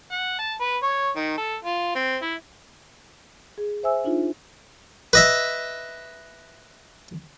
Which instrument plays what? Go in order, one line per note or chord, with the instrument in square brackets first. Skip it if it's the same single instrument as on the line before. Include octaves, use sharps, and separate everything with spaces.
[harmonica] F#5
A5
B4
C#5
D#3
A4
F4
C4
E4
[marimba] G#4
C5 E5 G#5 E6
D4 D#4 F4
[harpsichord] B4 D#5 E5